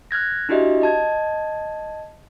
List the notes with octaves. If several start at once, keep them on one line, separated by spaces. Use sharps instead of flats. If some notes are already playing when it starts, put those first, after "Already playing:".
F6 F#6 G#6 A#6
D4 E4 F#4 G4 D#5 E5
D#5 A5 G#6